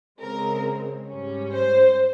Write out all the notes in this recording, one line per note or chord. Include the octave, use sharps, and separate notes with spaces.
C#3 G#3 C4 A#4
G#2 G3 C#4
C5